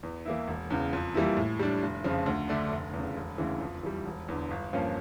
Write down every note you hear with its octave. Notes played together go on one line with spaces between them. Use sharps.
E2
E3 A#3 E4
E1
E2 C#3
F2
E3 G3 A#3 E4
A2
G3 D4
F1
F2 C#3 F3
D2
D3 A3 D4
F1
E2 C#3
E1
D2 C#3 E3
F2
E3 G3
E1
E2 D3
G1
G2 F3 A#3 C#4